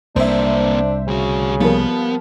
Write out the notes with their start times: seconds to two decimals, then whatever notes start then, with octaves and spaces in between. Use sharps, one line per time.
0.16 C2 A#3 C4 D4 C5 E5
1.08 D2 C#3 F#4
1.61 F3 G3 A#3 B3